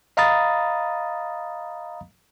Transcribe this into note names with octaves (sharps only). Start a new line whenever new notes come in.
D#5 F5 A#5 B5 D#6 A6